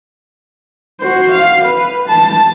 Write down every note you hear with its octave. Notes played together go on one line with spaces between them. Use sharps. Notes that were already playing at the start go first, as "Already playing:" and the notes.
F#4 C5
F5
B4
A5